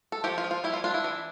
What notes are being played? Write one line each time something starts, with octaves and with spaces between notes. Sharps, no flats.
A4
F3 G4
F4
F3
F4
G3 E4
F4
D4 F4
E4
E3